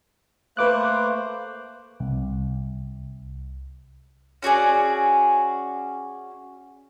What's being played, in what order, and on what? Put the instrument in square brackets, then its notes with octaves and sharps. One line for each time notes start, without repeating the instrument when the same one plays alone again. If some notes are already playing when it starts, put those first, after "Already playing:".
[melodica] A3 A#3 C5 [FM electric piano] B4 D6 F#6
[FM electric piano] C2
[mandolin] C#4 F#4 G#4 D5